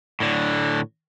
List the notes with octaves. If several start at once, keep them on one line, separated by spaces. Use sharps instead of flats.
A2 D3